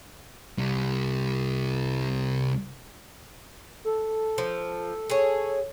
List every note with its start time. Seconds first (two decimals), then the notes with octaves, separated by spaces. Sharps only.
0.58 C2 G3
3.85 A4
4.38 F3
5.10 G#4 C#5